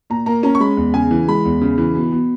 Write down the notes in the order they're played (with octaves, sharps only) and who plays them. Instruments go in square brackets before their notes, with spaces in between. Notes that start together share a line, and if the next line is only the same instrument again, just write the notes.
[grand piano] A#2 A#5
A#3 A#5
C#4 A#5
C#6
G#3 B5
E2
C#3 G#5
E3
G#3 B5
E2
C#3
E3
B2
B2